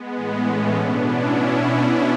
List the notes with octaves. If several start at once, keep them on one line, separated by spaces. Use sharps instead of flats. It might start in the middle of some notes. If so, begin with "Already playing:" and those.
Already playing: G#3 B3
A2 E3
A3 C#4
B2 B3 D4
C#4 E4